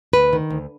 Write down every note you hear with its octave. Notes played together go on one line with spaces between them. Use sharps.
D2 B4
D#3
D2